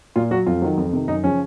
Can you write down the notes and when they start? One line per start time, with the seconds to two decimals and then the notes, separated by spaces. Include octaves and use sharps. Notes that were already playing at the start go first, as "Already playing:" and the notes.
0.16 A#2 F4
0.31 F#3 F#4
0.46 F2 F4
0.62 D#3 F#3
0.77 F2
0.93 C3 D#3
1.08 F#2 D#4
1.24 C#3 F3 C#4